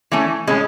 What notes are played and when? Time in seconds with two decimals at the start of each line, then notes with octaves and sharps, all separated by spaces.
0.12 E3 A3 C#4
0.47 A2 G#3 C#4